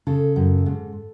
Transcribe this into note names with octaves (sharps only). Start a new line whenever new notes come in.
C#3 A4
F#2
G#2